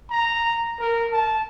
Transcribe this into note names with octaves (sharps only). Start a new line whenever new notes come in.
A#5
A#4
A5